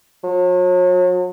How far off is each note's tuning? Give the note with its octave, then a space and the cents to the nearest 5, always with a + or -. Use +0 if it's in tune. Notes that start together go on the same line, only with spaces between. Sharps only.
F#3 -40